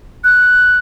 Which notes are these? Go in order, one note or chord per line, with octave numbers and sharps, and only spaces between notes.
F#6